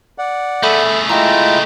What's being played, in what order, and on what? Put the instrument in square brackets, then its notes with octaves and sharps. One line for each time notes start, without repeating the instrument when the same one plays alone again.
[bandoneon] D5 F#5
[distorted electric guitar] A3 G#4 [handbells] A4 E5 B5
[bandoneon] G#3 E4 F4 [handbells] D#5 G5 A#5